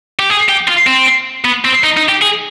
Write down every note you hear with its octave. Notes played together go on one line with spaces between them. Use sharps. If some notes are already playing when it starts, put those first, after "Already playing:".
G4
G#4
G4
F4
C4
B3
C4
D#4
D#4
G4
G#4